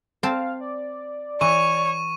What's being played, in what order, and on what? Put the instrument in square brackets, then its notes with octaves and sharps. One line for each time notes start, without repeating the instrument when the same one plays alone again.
[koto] C4 A5 [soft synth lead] F5
[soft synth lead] D5
[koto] E3 [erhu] C#5 [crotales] C#6 D#7